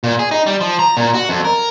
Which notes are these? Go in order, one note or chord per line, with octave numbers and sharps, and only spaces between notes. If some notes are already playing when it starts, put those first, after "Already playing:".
A#2
G#4
D#4
G3
F3
A#5
A#2
F#4
F2
A#4